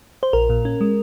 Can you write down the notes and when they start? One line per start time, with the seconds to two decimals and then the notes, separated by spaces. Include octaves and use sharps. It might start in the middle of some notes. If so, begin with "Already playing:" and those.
0.23 C5
0.33 A#1 A#4
0.50 A#2
0.65 C#4
0.81 G#3